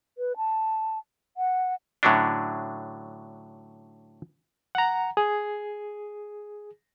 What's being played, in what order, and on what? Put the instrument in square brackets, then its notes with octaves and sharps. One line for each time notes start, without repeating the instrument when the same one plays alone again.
[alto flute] B4
A5
F#5
[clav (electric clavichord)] A2 D3 F#3 C#4 D4
[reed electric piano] F#5 A#5
G#4